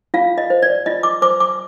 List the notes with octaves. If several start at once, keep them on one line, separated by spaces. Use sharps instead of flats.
F4 F5
D#5
C5
D5
F4 D#5
D6
C5 D6
D6